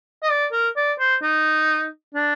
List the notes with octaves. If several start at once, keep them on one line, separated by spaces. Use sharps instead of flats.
D#5
D5
A#4
D5
C5
D#4
D4